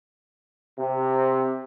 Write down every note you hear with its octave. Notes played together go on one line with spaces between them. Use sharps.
C3